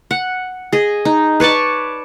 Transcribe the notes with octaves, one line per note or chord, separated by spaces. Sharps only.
F#5
G#4 D#5
D#4
B4 C#5 D5 A5